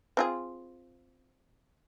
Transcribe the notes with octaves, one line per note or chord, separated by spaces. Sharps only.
C4 F4 G#4